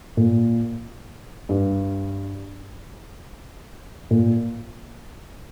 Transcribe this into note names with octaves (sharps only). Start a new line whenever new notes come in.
A#2
G2
A#2